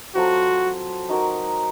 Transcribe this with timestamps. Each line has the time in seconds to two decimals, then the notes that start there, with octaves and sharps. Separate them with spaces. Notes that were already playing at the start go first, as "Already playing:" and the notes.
0.15 F#3 C4 F4 F#4 A4
1.09 D#4 F#4 A#4